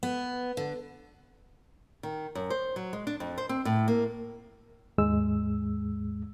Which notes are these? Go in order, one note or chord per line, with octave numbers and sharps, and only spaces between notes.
B3
D3
D#3
F#2
C5
F#3
G#3
D4
F2
C5
C4
A2
A#3
D#2 G#2 G#3 E6